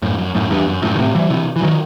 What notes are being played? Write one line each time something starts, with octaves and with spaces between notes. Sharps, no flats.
F#2 A2
F#2
F#2 A2
E2 G2
F#2
F#2 A2
D#3
A2 C3
E3 G3
C3 E3
E3
D#3 F#3